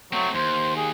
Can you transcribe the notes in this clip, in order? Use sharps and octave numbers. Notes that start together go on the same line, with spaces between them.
F#3 A3 C4
D#2 C5
G#4